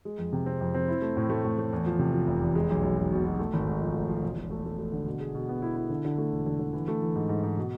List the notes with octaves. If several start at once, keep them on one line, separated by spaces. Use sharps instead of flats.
G#3
F2
C3
C4
F2
C4
E4
A3
A2
A3
A2
A3
E2
F3
C3
F3
F1
E2
G#3
B1
B1
G#3
B2
B2
A3
G#1
G#2
F3
A3
F3
E1
E1
A3
A3
A3
D3
B2
G#4
B2
B3
E4
E4
D3
D3
A3
E1
D3
D3
E3
A3
E3
G#2
G#2
G#2
B2